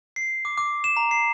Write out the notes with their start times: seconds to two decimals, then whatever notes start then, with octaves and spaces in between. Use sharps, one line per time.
0.16 C7
0.45 D6
0.58 D6
0.84 E7
0.97 A#5
1.11 C7